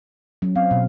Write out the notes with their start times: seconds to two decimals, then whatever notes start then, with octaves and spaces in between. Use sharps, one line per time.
0.42 F#3 C#4
0.56 C4 F5
0.71 B2